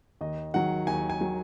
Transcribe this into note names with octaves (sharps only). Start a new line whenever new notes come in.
D#2 D#5
D#3 F#3 F#5
D#2 G#5
G#5
D#3 F#3